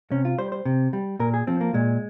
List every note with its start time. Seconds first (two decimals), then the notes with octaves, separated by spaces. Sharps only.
0.11 C3 C#4
0.25 F4
0.38 G3 C5
0.52 C5
0.65 C3
0.93 G3
1.19 A#2 A#4
1.34 G#4
1.47 F3 C4
1.61 A#3
1.74 A#2 G#3